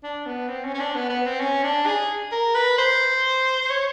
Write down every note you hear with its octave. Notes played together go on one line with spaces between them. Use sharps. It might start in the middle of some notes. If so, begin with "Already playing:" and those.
D4
B3
C4
C#4
C#4
D4
B3
B3
C4
C#4
D4
G#4
A#4
B4
C5
C#5